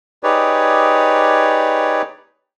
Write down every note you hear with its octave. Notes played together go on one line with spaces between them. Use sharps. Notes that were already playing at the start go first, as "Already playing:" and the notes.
D#4 G4 G#4 B4 C#5 D5